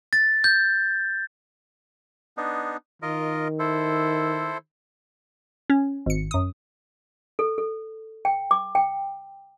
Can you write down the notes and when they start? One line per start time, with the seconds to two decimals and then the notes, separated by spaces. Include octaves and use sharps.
0.13 A6
0.44 G6
2.37 B3 D4 D#4
3.02 D#3 F4 A#4 D#5
3.59 E4 A4 C5
5.70 C#4
6.06 G#1 C#7
6.31 F#2 D#6
7.39 A4
7.58 A4
8.25 G5
8.51 D6
8.75 G5